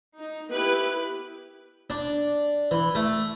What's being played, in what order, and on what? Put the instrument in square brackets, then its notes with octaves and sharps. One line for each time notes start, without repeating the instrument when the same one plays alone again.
[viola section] D#4
B3 E4 G4 B4
[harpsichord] D4
E3
A3